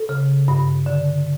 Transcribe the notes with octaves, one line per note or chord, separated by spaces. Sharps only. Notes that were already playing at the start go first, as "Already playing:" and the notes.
Already playing: A4
C#3
G2
D3